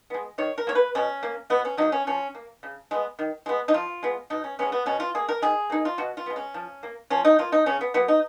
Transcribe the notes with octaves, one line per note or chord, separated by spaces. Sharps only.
G#3 B3
D#3 C#5
A#4
A#3 C#5
B4
B2 C#4
A#3
B2 B3
C#4
F#3 A#3 D#4
C#4
F3 C#4
A#3
C#3
G#3 B3
D#3
G#3 B3
D#4
F3 F4
G#3 B3
B2 D#4
C#4
G#3 B3 C#4
B3
B2 C#4
F4
A#3 G#4
A#4
D#3 G#4
A#3 D#4
F4
B2 F#4
F4
G#3 B3
C#4
F3
A#3
F3 C#4
D#4
A#3 F4
D#4
C#3 C#4
B3
F#3 A#3 B3
D#4